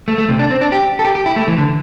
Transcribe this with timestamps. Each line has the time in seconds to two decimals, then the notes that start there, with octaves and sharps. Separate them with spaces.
0.08 A3
0.18 A3
0.29 C3
0.39 D4
0.51 C4
0.61 D4
0.72 G4
0.99 A4
1.05 G4
1.15 G4
1.26 E4
1.36 A3
1.48 E3
1.58 D3